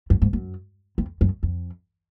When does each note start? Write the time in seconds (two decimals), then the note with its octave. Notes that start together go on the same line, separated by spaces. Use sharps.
0.10 F#2
0.22 G#2
0.33 F#2
0.98 F2
1.21 F#2
1.43 F2